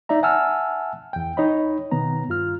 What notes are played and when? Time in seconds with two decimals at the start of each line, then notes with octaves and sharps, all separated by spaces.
0.09 D#4 D5 E5 A#5
0.22 E5 F#5 G#5 A5 E6 F6
1.13 E2 G5
1.37 D#4 C#5 D#5 B5
1.91 B2 D#3 B3 A#5
2.29 G2 F4 F6